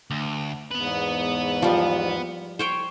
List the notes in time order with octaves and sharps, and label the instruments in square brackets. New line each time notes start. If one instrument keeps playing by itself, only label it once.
[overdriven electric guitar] D2
[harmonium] E2 G#2 [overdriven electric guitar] B3 B4
[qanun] F3 G3
C5 C#5 G5